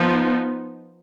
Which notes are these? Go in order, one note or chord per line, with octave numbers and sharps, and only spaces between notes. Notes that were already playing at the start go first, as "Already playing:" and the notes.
Already playing: F3 B3 D#4